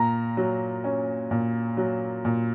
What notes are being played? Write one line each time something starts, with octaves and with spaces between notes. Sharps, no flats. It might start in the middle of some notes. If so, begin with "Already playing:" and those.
Already playing: A#2 A#5
F#3
C#4
A#2
F#3
A#2